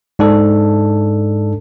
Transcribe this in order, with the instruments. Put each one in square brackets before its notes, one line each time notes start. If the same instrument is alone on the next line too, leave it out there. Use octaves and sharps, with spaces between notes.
[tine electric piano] G#2 D4 A4